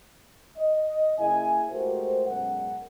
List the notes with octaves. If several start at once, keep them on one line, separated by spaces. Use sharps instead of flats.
D#5
C#3 A#3 E4 G#4 E5 G#5
G#3 A3 F#4 G4 A#4 C5
F#2 B2 G#3 C#4 A#4 F#5